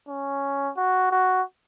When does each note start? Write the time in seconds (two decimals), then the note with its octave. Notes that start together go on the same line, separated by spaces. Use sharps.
0.08 C#4
0.77 F#4
1.11 F#4